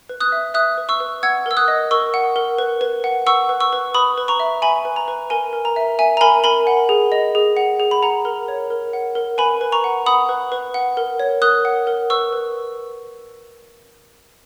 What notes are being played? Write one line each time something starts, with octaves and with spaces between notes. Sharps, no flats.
B4
D#6 F#6
E5
E5 D#6 F#6
B4
C#6 E6
B4
F#5 E6 G#6
A#4 E6
D#6 F#6
D#5
A#4 C#6 E6
F#5
A#4
B4
B4
F#5
F#5 C#6 E6
B4
C#6 E6
B4
B4 B5 D#6
B4
A#5 C#6
E5
E5 G#5 B5
B4
A#5
B4
A#4 G#5
A#4
A#5
E5
E5 G#5
A#5
A#4 G#5 B5
A#4 G#5 B5
F#5
G#4
D#5
G#4
F#5
G#4
B5
F#5 A#5
A#4
C#5
A#4
F#5
A#4
B4 G#5 B5
B4
A#5 C#6
F#5
F#5 B5 D#6
B4
B4
F#5
A#4
C#5
A#4 D#6 F#6
F#5
A#4
B4 C#6 E6
B4